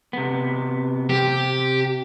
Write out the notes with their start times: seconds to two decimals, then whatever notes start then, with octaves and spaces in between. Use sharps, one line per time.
0.13 C3 B3
1.10 C3 G4